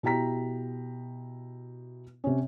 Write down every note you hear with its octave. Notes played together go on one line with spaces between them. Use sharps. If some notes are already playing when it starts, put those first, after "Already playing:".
B2 E4 G4 G5 A#5 B6
C3 C#4